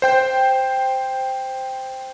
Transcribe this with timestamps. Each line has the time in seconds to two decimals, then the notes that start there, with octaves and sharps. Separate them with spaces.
0.02 C5 G5 G6